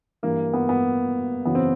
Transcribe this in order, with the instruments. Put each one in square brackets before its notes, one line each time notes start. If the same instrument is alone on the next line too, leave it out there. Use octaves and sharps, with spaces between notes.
[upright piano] G2 E3 A#3
B3
B3
F#2 C#3 E3 B3
C4